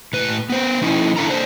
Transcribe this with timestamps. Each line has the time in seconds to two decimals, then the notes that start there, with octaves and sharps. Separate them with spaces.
0.13 A2 B4
0.50 B3 C5
0.82 F3 C#4 D#4 E4
1.17 E3 D4 E4 F4 A4 A#5
1.30 D4 B4 C5